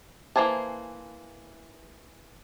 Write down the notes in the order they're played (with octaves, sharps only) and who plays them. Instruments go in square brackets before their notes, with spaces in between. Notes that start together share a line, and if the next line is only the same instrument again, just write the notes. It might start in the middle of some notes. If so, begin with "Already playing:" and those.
[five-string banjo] E3 A#3 C5 G#5 A5